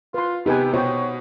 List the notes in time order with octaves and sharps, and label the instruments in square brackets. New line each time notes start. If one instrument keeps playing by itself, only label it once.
[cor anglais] F4 [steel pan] B4 C6
[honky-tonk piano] C3 B3 [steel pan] D#4 B4 G#5 [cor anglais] G4
[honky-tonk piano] B2 [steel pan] C5 G5 [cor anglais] C#5